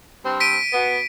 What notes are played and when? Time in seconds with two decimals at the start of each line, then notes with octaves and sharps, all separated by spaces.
0.24 G2 C4
0.40 B6 D7 D#7
0.73 B2 B3